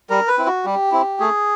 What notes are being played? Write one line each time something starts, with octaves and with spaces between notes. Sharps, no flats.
G3 A#4
B4
C4 E4
F#4
G3 G4
C4 E4
A3 G#4